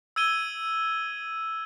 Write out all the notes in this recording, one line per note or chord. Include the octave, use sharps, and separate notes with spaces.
E6 G#6 D#7 G7